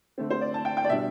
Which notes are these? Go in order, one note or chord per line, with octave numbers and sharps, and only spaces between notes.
D3 A3 C4
C5
D5
A5
G5
G5
D5
B2 G3 D4 E5